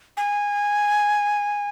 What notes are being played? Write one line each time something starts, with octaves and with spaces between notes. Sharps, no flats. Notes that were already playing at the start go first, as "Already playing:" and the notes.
G#5